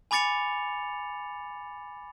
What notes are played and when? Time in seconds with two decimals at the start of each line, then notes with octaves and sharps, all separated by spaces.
0.11 G#5 B5 D6 A6 C#7 F7